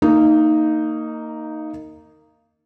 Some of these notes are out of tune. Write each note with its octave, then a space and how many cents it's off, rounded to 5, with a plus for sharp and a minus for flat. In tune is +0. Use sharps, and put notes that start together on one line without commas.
A#3 -25 D#4 +0 D#5 +0